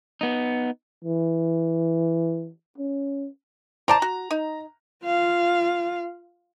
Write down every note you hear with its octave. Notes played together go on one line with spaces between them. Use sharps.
B3 D#4
E3
C#4
C5 D5 A5 A#5
F#4
D#4
F4 F5